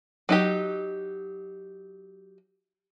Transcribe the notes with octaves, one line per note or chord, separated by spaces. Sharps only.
F#3 D#4 G4